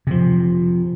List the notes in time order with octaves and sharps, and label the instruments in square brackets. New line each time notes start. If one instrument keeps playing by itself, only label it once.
[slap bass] C3 F3